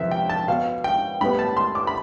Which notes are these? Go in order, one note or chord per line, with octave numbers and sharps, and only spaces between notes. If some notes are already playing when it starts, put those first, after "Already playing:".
Already playing: F2 C3 E3 E5
G5
A5
B2 B3 F5
G5
A2 G3 B3 B5
A5
C6
D6
B5